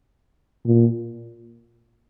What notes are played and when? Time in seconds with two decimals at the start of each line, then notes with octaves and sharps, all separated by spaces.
0.66 A#2